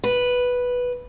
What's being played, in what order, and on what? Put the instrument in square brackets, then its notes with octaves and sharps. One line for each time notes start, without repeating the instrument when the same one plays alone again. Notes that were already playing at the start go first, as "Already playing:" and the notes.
[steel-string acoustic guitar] B4